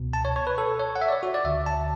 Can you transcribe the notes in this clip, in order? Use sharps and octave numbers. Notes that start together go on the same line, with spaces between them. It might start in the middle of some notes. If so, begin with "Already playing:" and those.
Already playing: C#2 B2
A5
C#5
C#5
B4
A4
C#5
F#5
E5
D5
C#5
F#4
D5
D2 D3 E5
A5